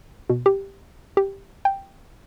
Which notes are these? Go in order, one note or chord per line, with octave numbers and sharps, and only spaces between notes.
B2
G4
G4
G5